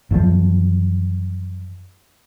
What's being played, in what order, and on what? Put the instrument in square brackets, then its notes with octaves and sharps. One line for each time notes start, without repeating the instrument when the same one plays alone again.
[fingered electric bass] F#2 E3 F3